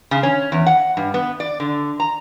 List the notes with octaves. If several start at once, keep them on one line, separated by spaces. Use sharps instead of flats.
C#3
C#4
E2
F#5
G2
B3
D5
D3
A#5